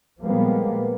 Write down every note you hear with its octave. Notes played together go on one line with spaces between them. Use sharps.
A#2 F3 G3 G#3 A#3 B3